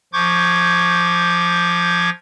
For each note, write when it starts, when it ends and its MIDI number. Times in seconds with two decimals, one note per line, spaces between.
0.13 2.10 53
0.13 2.10 85
0.13 2.10 86
0.13 2.10 91
0.13 2.10 92